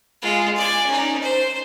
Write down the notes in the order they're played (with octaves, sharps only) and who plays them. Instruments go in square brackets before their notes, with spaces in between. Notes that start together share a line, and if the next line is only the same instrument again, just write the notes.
[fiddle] G#3 F4
D5 G#5
C#4 D#4
C5